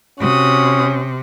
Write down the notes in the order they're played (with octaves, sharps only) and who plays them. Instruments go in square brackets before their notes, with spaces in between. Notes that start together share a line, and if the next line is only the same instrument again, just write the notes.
[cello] C3 [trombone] C#4 [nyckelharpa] F#4 D#6